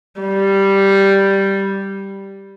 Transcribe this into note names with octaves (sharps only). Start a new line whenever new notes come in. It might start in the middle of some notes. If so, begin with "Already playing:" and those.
G3